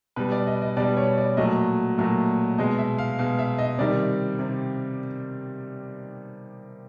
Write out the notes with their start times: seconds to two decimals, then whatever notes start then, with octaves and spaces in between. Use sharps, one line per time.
0.16 B2 G3 B4
0.32 D5
0.47 D#5
0.62 D#5
0.77 B2 G3 D5
0.97 C#5
1.18 D5
1.37 A#2 F#3 A3 D#5
1.98 A#2 F#3 A3
2.58 B2 G#3 D#5
2.78 E5
2.98 F5
3.19 B2 G#3 F5
3.39 E5
3.59 D#5
3.78 C3 D#3 G3 D5
4.39 C3